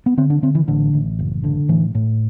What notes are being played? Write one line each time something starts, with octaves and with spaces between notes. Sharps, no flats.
B3
D3 C4
D4
D3 C4
E3
A1 D3
A1
F#1
D3
A2 E3
A2